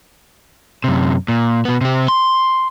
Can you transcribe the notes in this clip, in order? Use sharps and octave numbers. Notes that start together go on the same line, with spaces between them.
F#2 C3
A#2
B2 B3
C3 C4
C6